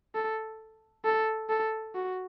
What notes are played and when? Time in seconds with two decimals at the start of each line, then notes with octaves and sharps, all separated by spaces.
0.15 A4
1.05 A4
1.49 A4
1.95 F#4